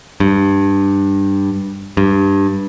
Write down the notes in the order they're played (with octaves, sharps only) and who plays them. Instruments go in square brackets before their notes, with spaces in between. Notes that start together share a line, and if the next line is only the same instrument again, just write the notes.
[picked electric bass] G2
G2